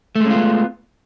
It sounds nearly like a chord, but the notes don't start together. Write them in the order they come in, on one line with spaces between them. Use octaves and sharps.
A3 G#3 C#4 F4 B3